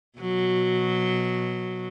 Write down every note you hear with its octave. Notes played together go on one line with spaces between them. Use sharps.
B2 F#3